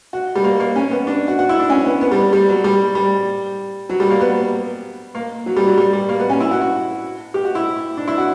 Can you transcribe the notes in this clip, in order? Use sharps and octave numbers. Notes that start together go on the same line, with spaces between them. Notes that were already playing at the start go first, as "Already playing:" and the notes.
F#4
G3
A#3
A#3
C#4
B3
D4
F#4
F#4
E4
D4
C#4
B3
B3
G3
G3
F#3
G3
G3
F#3
G3
A#3
B3
A#3
F#3
G3
F#3
G3
G3
A#3
B3
C#4
E4
F#4
F#4
G4
F#4
E4
D4
E4
F#4